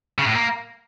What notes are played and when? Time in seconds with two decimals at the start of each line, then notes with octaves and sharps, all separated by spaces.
0.18 C#3
0.27 A2
0.35 A#3